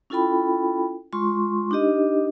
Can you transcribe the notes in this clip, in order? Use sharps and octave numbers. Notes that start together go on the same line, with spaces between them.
C#4 E4 F4 A4 G5 B5
G#3 F4 C6 C#6
D4 D#4 G4 D#5